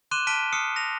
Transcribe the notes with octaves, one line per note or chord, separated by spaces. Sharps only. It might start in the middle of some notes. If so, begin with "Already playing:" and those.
C6 D6 F#6 D#7 E7 G7
A5 F6 B6 D7 D#7 G7
D#6 F6 C7 C#7
A#6 F7